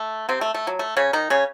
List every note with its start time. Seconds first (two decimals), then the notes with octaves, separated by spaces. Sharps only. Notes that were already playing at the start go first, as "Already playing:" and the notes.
Already playing: A3
0.29 C3 C4
0.41 A3
0.54 A3
0.67 F#3
0.79 A3
0.97 C#3 C#4
1.13 D#3 D#4
1.30 C#3 C#4